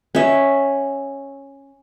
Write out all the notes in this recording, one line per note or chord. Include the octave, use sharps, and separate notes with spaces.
C#4 E5